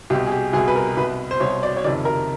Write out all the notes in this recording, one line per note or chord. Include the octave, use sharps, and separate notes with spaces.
C2 B2 G4
G#4
G4
C2 B2 G#4
B4
A#4
C2 B2 B4
C5
C2 B2 C#5
D5
C#5
F#1 F2 C3 D#3 D5
A#4